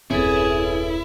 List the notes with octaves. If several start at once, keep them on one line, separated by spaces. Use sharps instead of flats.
D#1 F#2 C4 E4 G#4 A4 B4 C#5